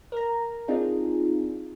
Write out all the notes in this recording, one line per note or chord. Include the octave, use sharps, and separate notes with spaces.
A#4 A#5
C4 D4 D#4 F4 G#4